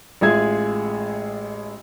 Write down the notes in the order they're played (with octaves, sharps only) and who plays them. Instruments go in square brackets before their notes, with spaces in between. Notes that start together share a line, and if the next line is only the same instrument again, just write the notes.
[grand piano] A1 G#3 F4 G#4 E5 G#6